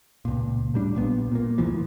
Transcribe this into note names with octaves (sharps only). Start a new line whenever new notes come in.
C#2 A#2
A2 G3 D4
A#1 A#2 B3
A#2 A#3
D2 G#2 E3 F3